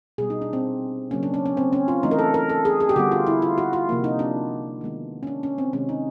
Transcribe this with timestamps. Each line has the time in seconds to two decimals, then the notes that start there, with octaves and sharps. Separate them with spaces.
0.18 B2 G3 B3 G#4
0.30 D#4
0.42 D4
0.53 C4
1.11 C#3 F#3 A#3 C#4
1.23 D4
1.34 C#4
1.46 C#4
1.57 C4
1.73 C#4
1.88 F4
2.03 E3 A3 C4 D#4
2.11 A#4
2.19 A4
2.34 A#4
2.50 A4
2.65 G#4
2.80 G#4
2.89 G4
2.96 D3 G3 B3 F#4
3.12 F4
3.27 E4
3.42 F4
3.58 F#4
3.73 F4
3.89 C3 F3 A#3
4.04 D#4
4.19 D4
4.81 D#3 G#3 B3
5.23 C#4
5.27 D4
5.43 C#4
5.58 C4
5.73 C3 D#3 G#3 C4 C#4
5.89 D#4